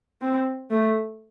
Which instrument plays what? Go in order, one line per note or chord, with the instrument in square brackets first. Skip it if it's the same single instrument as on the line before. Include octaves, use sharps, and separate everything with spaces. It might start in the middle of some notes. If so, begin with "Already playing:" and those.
[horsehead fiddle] C4
A3